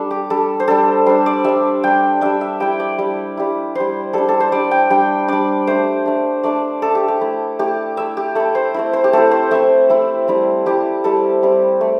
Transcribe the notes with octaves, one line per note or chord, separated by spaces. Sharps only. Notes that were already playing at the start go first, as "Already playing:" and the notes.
Already playing: G3 D4 A4
G4
G3 D4 A4
C5
G3 D4 A4
G3 D4 C5
D5
G3 D4 E5
G3 D4 G5
G3 D4 E5
E5
G3 E4 G5
D5
G3 E4
G3 E4
G3 E4 C5
G3 D4 A4
A4
C5
G3 D4 D5
G5
G3 D4 G5
G3 D4 D5
A3 D4 C5
A3 D4
A3 D4 D5
A3 D4 A4
G4
G4
A3 E4
A3 E4 G4
A3 E4 E5
G4
A3 E4 A4
C5
A3 C4 E4
C5
G4
A3 C4 E4 A4
C5
A3 C4 E4 E5
A3 C4 E4
G3 C4 E4
G3 C4 E4 G4
G3 C4 E4 A4
G3 C4 E4
A3